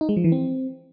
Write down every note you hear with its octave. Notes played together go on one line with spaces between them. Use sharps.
D#4
G#3
F3
E3
C4